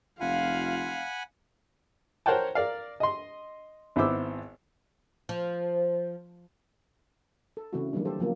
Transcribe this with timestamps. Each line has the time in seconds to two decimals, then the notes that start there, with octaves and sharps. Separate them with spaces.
0.21 F1 F4 F5 F#5 G#5 B5
2.26 A#4 C5 C#5 F#5 G5 A5
2.55 A#4 D5 F5
3.00 D#5 C6
3.96 G#1 B3 E4 C5 D6 E6
5.29 F3
7.57 A4
7.73 C#3 E3 A3 C4 E4 F#4
7.93 D#3 E3 F#3 G3 A#3 D4
8.05 G4 A4 C5
8.19 C#3 F3 F#3 A#3 B3